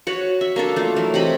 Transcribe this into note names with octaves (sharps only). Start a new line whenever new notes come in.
F#4 B4 C#5
E5
A#3 D4 A4
A3 F4
E3 F#3
C3 D#5 B5